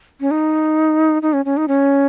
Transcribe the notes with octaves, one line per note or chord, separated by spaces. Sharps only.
C#4
D#4
D#4
C#4
C#4
D#4
C#4